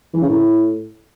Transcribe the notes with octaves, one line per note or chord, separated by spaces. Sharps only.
E3
C#3
A2